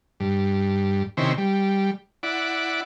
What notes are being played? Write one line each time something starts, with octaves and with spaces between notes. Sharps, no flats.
G2
C3 D#3 C4 C#4 E4
G3
E4 D5 F#5